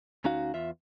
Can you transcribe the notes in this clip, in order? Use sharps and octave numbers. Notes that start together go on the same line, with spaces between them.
D2 C#4 D#4 F#4 F5
E2 F4 E5